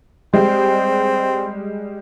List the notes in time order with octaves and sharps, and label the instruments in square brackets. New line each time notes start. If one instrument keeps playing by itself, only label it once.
[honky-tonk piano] G3 G#3 G4 [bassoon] C4